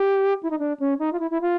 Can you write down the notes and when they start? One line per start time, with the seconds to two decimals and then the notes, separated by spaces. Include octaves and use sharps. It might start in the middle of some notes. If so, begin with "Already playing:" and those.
Already playing: G4
0.43 E4
0.51 D#4
0.59 D4
0.80 C#4
0.99 D#4
1.13 F4
1.20 E4
1.31 E4
1.41 F4